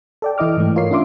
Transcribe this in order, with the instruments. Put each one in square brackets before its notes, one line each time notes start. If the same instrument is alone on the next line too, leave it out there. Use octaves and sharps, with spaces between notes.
[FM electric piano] A4 D5 G5
E3 E4 D#5 D6 F6
G#2 E3 A3
F4 A#4 C#5 C7
C#4 D4 F4 E5 C6 D6